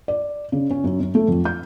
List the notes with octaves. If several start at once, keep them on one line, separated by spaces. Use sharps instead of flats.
D5
C#3
C#4
F#2
F#2
A3
F2
G6